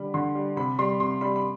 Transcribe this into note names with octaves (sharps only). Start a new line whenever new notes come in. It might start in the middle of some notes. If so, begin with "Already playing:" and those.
Already playing: D3 G3 B5
D3 C6
G3
C3 B5
G3 C6
C3 C6
G3 B5
B5